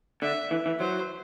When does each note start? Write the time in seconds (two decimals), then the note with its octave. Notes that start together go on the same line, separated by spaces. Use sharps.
0.22 D3 E5
0.51 E3
0.66 E3
0.80 F#3 C5